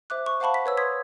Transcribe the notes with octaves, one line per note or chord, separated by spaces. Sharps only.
C5 E5 D6 F#6
C#6
C5 F5 F#5 A5 B5 C#6
B6
B4 C#5 E6
C6 D#6 G#6 B6